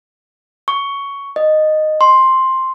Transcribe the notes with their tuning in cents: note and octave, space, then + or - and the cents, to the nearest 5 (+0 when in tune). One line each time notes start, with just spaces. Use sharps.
C#6 +10
D#5 -10
C6 +5